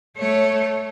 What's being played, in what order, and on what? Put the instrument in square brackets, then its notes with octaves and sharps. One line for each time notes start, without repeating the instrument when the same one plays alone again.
[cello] A3 C#5